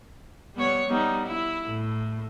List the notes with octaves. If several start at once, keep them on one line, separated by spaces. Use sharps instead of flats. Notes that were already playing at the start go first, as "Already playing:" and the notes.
G3 B3 C#5
G3 B3 D#4
E4
A2